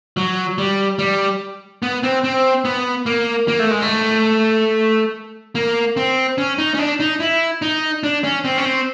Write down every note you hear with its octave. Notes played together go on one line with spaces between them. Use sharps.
F#3
G3
G3
B3
C4
C4
B3
A#3
A#3
A3
G#3
A3
A#3
C4
C#4
D#4
C#4
D4
D#4
E4
D#4
D4
C#4
C4
C#4
C4